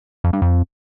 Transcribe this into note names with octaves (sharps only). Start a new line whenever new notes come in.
F2
G2
F2